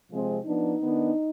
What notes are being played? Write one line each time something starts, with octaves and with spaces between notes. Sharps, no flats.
C3 F3 G#3 C4
F3 B3 D4 D#4
D#3 B3 D4